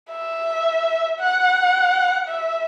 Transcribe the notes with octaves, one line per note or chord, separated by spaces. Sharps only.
E5
F#5
E5